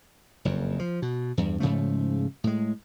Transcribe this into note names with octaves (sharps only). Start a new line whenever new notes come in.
F#1 F2
F3
B2
E2 G2
G#2 C#3 F3 A3
A2 G#3